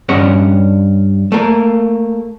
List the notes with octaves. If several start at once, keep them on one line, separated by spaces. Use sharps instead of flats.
G2 C#4 D#5 F#5
A3 A#3